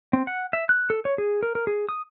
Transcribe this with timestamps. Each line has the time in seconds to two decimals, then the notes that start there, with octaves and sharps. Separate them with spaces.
0.13 C4
0.27 F#5
0.53 E5
0.69 F#6
0.90 A4
1.05 C#5
1.18 G#4
1.43 A#4
1.55 A#4
1.67 G#4
1.89 D#6